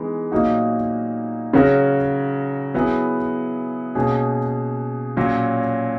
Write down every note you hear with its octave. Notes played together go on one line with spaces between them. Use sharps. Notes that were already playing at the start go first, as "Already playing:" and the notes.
Already playing: E3 G#3 B3 D#4
A#2 F#3 A#3 D#4 F#4
C#3 F#3 C#4 F#4 A#4
F#3 B3 E4 G#4
B2 A#3 C#4 G#4
A#2 F#3 C#4 F#4